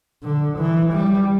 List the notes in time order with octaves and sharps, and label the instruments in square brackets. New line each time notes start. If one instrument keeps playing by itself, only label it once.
[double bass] D3
E3
G3